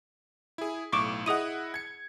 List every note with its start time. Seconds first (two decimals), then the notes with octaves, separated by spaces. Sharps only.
0.58 E4 G#4
0.92 B1 A2 C#6 D6 D7 E7
1.26 E4 G#4 D#5 F#5 D#6 D#7
1.74 G#6 C#7